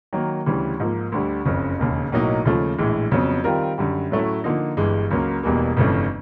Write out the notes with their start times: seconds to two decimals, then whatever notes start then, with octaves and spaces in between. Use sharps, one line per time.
0.13 D#3 F#3 A#3
0.46 D2 C#3 E3 G3
0.80 G#2 F3 A#3
1.12 D2 D3 G3
1.45 F#1 F2 C#3
1.79 E1 D#2 C#3
2.12 B1 A2 F#3 A#3 D#4
2.45 D#2 C#3 F3 A3
2.78 A#1 A2 E3 G#3
3.12 F2 C#3 F#3 B3
3.44 D#3 G3 C4 F4 A#4
3.78 F#2 D3 G3
4.11 A2 F#3 A3 C#4 E4
4.44 D3 F3 A#3 D#4
4.77 G1 G2 E3 G#3
5.11 C#2 C#3 F#3 A#3
5.43 E1 E2 B2 G3 A#3
5.77 G1 F2 C#3 E3 A3